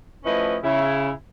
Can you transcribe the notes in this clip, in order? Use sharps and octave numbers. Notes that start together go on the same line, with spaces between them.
F3 A3 C#4 E4 B4 D#5
C#3 E4